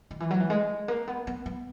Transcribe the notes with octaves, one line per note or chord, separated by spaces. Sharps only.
D#3
E3
F#3
E3
G#3
A#3
B3
B3
B3